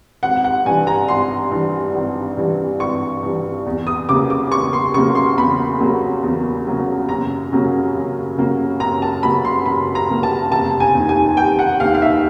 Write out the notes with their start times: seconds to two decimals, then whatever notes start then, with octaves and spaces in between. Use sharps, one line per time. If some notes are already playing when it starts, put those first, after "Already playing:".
0.23 G#1 F#5
0.44 F#5
0.66 G2 E3 G#5
0.87 A#5
1.08 G#1 C6
1.51 G2 E3
1.94 G#1
2.37 G2 E3
2.79 G#1 C#6
3.23 G2 E3
3.66 E2
3.87 D#6
4.09 C#3 F#3 A#3 D6
4.30 D6
4.51 E2 C#6
4.73 C6
4.94 C#3 F#3 A#3 C#6
5.15 C6
5.37 E2 B5
5.80 C#3 F#3 A#3
6.23 E2
6.66 C#3 F#3 A#3
7.09 F#2 A#5
7.52 C#3 F#3 A#3
7.95 F#2
8.37 C#3 F#3 A#3
8.80 F#2 A#5
9.02 A5
9.23 C#3 F#3 A#3 B5
9.45 C6
9.66 F#2 B5
9.95 A#5
10.09 C#3 F#3 A#3
10.23 A5
10.52 F1 A5
10.80 G#5
10.94 D#2
10.99 D#3
11.09 G#5
11.37 F1 G5
11.59 F#5
11.80 D#2 D#3 F5
11.95 F5
12.02 E5